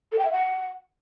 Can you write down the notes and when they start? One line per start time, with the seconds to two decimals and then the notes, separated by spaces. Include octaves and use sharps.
0.12 A4
0.19 G5
0.25 E5
0.32 F#5